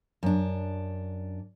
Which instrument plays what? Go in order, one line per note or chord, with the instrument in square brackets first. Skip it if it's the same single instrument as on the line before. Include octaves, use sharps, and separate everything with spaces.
[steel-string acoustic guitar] F#2 D4